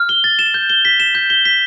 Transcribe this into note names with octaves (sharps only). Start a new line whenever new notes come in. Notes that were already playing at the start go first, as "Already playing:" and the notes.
Already playing: F6
G7
A6
E7
G6
G7
B6
E7
G6
G7
B6